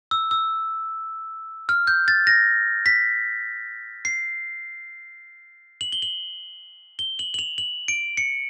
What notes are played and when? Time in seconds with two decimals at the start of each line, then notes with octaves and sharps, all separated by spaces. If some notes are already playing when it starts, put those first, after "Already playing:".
0.11 E6
0.31 E6
1.69 F6
1.87 G6
2.08 A6
2.27 A#6
2.86 B6
4.05 C7
5.81 F#7
5.92 G7
6.02 F#7
6.99 G7
7.19 F#7
7.34 F#7
7.39 F7
7.58 F#7
7.88 D7
8.17 C#7